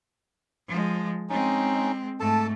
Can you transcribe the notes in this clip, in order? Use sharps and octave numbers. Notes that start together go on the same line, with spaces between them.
F3 G#3
G#3 C4 C#4 D#4
G#2 A3 A4 A5